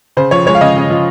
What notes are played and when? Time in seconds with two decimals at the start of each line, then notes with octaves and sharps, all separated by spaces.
0.17 C#3 C5
0.31 F3 C#5
0.46 G#3 C#5
0.55 F5
0.61 C#3 D#5
0.76 C#3
0.90 F3